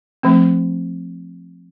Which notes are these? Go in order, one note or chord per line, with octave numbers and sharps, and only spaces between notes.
F3 A3 C4